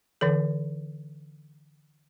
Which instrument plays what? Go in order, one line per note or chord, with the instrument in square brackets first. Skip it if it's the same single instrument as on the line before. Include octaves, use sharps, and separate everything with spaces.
[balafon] D3 E3 A4